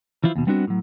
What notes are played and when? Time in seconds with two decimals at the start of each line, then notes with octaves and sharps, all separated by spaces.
0.24 E3 F3 E4 F4
0.36 D#2 B2
0.47 G3 B3 C4 D4 F#4
0.67 A2 F#3